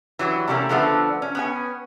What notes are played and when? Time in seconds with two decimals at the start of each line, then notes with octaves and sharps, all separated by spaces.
0.19 E3 F#3 G3
0.48 C3 G3 A3 A#3 C#4
0.69 D3 F3 A3 B3 D4
1.22 C#4
1.35 B3 C#4 G#5